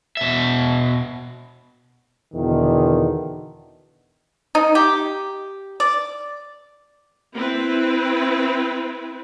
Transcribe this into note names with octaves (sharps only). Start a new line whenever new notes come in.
B2 E5
E2 B2 D3 D#3
D#4
G4
D5
C4 E4 B4